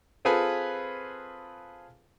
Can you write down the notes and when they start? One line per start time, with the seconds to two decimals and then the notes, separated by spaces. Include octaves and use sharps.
0.25 C4 F4 G#4 A4 B4 G#5